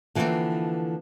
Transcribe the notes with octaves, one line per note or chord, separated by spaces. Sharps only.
D3 E3 F3 G3 A#3 C4